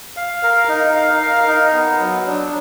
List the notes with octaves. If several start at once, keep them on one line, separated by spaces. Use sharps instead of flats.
F5
A#4
D#4
F5
A#4
D#4
B3
F#3
D4